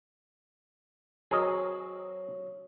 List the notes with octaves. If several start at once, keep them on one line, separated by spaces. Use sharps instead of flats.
F#3 C4 F#4 G#4 A#4 D#5